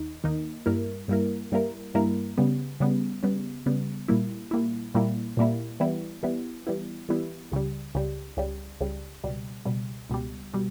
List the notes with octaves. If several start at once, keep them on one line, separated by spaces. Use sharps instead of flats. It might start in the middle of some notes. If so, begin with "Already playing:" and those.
Already playing: D#2 D#4
D#2 D#3 A#3 D#4
G2 G3 A#3 E4 A#4
G2 G3 A#3 E4 A#4
G2 G3 A#3 E4 A#4
G2 G3 A#3 E4 A#4
C#3 G3 B3
C#3 G3 B3
C#3 G3 B3
C#3 G3 B3
A#2 G3 A#3 E4
A#2 G3 A#3 E4
A#2 G3 A#3 E4
A#2 G3 A#3 E4
E3 G3 B3 E4
E3 G3 B3 E4
E3 G3 B3 E4
E3 G3 B3 E4
C#2 C#3 G3
C#2 C#3 G3
C#2 C#3 G3
C#2 C#3 G3
C#2 B2 G3
C#2 B2 G3
C#2 B2 G3
B2 G3